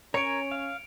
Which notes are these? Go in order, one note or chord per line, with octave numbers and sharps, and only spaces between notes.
C#4 A#4 C#5 G#5 C#7 D7 F7
F5